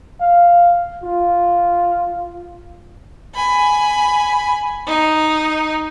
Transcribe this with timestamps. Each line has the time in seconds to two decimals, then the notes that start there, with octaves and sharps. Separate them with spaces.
0.20 F5
1.04 F4
3.34 G#5 B5
4.87 D#4